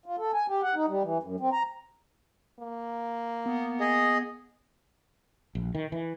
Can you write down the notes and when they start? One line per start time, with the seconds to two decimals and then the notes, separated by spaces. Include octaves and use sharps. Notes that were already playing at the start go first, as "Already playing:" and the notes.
0.06 F4
0.18 A4
0.34 G#5
0.48 G4
0.63 F#5
0.75 D#4
0.88 G3
1.03 E3
1.23 F#2
1.40 C4
1.53 A#5
2.60 A#3
3.46 B3
3.80 G#4 D#5
5.55 A#1
5.75 D#3
5.92 E3